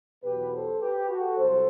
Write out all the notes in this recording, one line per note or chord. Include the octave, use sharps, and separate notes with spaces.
E2 B2 F#3 G4 B4
A4 C5
G4 B4
F#4 A4
C2 C3 F#3 A4 C5